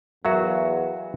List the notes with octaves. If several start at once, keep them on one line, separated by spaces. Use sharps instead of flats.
E2 F#3 F#4 A#4 E5 F5